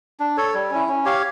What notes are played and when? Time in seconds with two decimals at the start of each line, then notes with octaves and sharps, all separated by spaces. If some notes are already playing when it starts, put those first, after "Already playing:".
0.20 D4
0.37 A4 C#5
0.54 G3
0.71 C#4 E4
0.89 C#4
1.05 G4 C#5 F5